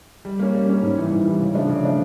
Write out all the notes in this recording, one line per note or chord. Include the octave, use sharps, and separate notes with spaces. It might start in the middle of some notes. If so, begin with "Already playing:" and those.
G3
A#3 C#4
G3
A#3 C#4
G#2
E3 G3
G#2
E3 G3
C#3
F3 A3 D4
C#3
F3 A3 D4